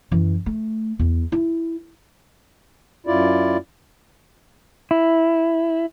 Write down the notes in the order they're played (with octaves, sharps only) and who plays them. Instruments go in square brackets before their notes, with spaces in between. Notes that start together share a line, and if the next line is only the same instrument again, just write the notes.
[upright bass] F#2 E3
A3
E2
E4
[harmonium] F#2 E4 F4 D5
[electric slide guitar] E4